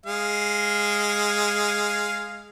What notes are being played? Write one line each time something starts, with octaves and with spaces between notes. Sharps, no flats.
G#3 F5